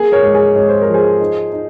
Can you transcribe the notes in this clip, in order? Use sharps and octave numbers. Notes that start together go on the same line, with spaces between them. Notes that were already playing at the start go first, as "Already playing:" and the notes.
Already playing: A#3 G#4
A#4 C#5
G#2
G#4
G#2 C#5
C5
A#4
F3
G#4 C5
D#4
D#4